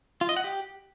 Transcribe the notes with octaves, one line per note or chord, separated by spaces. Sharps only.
F4
D#5
F#5
G4